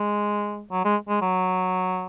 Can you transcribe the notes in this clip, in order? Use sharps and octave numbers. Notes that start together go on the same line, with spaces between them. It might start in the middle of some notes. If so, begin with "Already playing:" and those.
Already playing: G#3
F#3
G#3
G#3
F#3